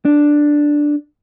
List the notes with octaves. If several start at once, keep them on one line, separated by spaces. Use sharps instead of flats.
D4